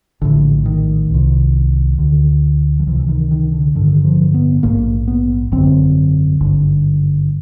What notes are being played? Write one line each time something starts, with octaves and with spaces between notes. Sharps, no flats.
A#1 A2 D3
D#3
C2 C3
D2 D3
F3
C#2 C3 E3
E3
D#3
D#3
D3
A1 G2 D3 D#3
F3
B3
A#1 G#2 A#3
B3
G#1 F#2 D3 C4
G#1 G2 D3